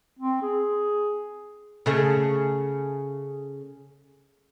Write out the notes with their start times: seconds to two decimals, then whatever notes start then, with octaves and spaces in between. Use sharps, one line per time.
0.19 C4
0.42 G#4
1.86 C#3 A3